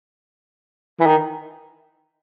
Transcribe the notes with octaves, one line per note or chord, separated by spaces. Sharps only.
E3
D#3